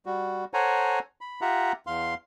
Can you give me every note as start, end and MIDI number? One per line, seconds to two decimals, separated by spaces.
0.06 0.45 55
0.06 0.45 66
0.54 0.99 69
0.54 0.99 72
0.54 0.99 73
0.54 0.99 78
0.54 0.99 80
0.54 0.99 82
1.21 1.40 83
1.41 1.72 65
1.41 1.72 67
1.41 1.72 76
1.41 1.72 78
1.41 1.72 82
1.87 2.14 40
1.87 2.14 77
1.87 2.14 84